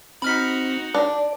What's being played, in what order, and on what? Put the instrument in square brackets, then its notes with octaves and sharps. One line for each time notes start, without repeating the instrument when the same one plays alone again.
[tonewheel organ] C4 [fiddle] D#4 F#4 [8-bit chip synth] B5 F6 B6
[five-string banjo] D4 [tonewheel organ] D5